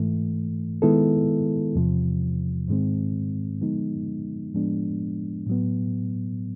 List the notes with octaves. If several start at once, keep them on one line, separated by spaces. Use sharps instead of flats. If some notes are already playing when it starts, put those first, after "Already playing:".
Already playing: G#2 E3 A3
D#3 G#3 B3 E4 A4
E2 C3 F3
G#2 D#3 G#3 C4
D3 F3 G#3 B3 D#4
A2 F3 G#3 B3 D4
A2 F#3 B3